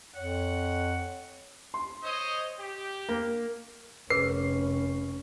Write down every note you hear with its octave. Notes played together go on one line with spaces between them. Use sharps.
F2 C#5 F#5
C6
C5 C#5 D#5
G4
A#3
F1 C#4 G#4 A#4 B4 C7